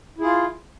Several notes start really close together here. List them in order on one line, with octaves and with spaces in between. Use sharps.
E4 G#4 F4